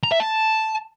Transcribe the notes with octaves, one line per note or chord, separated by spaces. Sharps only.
A#5
E5
A5